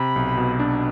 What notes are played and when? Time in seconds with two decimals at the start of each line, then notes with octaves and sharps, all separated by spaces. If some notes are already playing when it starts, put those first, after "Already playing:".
Already playing: C3 B5
0.16 B1
0.38 B2
0.59 D4